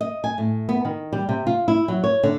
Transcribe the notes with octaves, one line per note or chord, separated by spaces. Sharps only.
D#5
G#5
A2
B3
D#3
G3
C3
F4
E4
F#3
C#5
D3